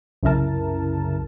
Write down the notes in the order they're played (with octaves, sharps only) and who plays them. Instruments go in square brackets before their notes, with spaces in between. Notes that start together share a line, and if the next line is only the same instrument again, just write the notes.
[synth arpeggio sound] C2 F#2 C#3 E4 A#4 A5